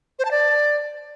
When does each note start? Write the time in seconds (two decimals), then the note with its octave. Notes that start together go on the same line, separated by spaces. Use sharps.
0.19 C5
0.25 A5
0.31 D5